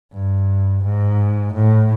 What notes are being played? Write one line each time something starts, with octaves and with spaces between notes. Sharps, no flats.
G2
G#2
A2